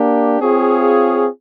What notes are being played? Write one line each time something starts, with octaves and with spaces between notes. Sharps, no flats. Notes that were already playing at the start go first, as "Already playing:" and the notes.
Already playing: A#3 D4 G4
C4 F4 G#4 C#5 F5